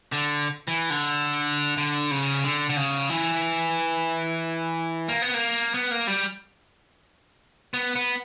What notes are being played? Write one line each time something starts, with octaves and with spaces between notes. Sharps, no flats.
D3
E3
D3
D3
C#3
D3
D3
C#3
E3
A#3
B3
A#3
B3
A#3
G3
B3
B3